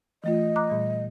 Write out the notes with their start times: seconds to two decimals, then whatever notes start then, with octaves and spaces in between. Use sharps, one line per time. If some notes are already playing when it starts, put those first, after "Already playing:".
0.24 E3 A3 F4 D#5
0.56 A#5 D6 F#6
0.70 A#2 G3